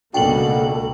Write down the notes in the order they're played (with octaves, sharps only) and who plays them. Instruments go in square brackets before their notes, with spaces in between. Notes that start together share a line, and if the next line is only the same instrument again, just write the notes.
[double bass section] C#2 B2 A#3 [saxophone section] D4 F#4 [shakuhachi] A4 [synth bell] G5 F#7